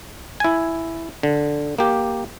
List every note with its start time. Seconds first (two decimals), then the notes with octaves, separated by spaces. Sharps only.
0.40 E4 G#5
1.23 D3
1.78 A#3 G4